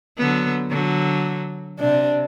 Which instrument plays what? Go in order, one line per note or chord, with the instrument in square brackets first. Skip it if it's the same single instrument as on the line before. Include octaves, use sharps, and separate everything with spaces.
[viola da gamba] D3 F#3 B3
D3 F#3
[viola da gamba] C3 [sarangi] D4